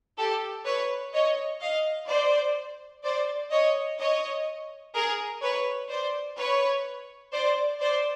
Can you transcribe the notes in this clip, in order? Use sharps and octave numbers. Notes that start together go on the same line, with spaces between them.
G4 A4
B4 C#5
C#5 D#5
D#5 F5
C5 D5
C5 D5
C#5 D#5
C#5 D#5
G#4 A#4
B4 C#5
C5 D5
B4 C#5
C5 D5
C5 D5